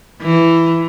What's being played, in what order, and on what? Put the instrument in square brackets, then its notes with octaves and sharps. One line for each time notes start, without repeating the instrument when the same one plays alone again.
[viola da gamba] E3